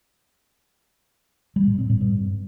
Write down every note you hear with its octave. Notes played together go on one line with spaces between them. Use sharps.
G3
A2
C4
A2
G2